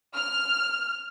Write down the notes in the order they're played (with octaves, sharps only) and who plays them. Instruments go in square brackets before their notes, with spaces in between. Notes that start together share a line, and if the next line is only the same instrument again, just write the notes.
[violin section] F6